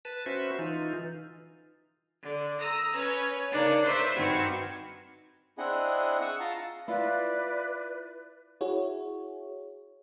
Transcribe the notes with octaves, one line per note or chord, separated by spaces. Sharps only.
B4 A5
C#4 F#4 B4 C5 E5
E3 D#4 F4
D3
A#5 D#6 E6
C#4 B4 C#5
C#3 A#3 D4 D#4
B4 C5 D5 E5 C#6
G2 D#3 C4 F#4 B4 G#6
C4 D4 E4 G#4 D#5 F#5
F#5 C#6 D#6 E6
F4 A5 A#5 C6
E4 F4 B4 D5
E4 F#4 G#4 C#5